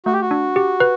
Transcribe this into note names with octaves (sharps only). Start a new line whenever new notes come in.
A3 F#4
G4
F#4
D4
G4
B4